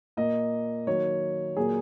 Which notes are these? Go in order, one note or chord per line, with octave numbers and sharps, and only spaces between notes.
A#2 A#3 D#5
D#3 F#3 A#3 C#5
A#2 F#3 A#3 G#4